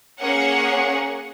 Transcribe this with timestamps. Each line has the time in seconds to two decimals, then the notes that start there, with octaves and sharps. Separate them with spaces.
0.20 A#3 C#4 G#4 C#5 F#5